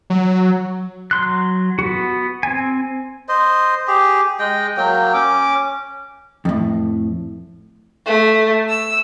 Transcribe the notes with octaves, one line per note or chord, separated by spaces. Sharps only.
F#3
F#3 C6 F#6
B3 F#4
C4 G#5
C5 D#5
G4 G#4
G#3 D#5 G5
F#3 A#3 G5
C#4 D6
F2 A2
A3
E6